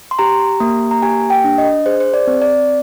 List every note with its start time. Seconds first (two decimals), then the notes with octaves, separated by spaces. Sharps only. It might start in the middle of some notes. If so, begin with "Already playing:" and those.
0.11 C6
0.19 G4 A#5
0.60 A#3
0.91 A#5
1.02 G4 G#5
1.30 G5
1.44 D4
1.58 D#5
1.86 G#4 C5
2.00 C5
2.14 D5
2.27 C4
2.42 D5